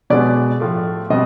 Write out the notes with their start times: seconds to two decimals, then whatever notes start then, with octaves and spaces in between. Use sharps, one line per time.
0.10 B2 G#3 B3 D5
0.60 A2 F3 A3
1.10 B2 G3 C4 D#5